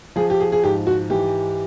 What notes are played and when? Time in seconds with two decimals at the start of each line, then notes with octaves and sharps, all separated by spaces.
0.16 F3 G#4
0.30 G4
0.40 G#4
0.52 G#4
0.64 G#2 G4
0.87 F#4
1.10 E3 G4